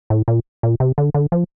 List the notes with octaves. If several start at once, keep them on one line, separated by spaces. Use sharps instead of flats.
A2
A#2
A#2
C3
D3
D3
F3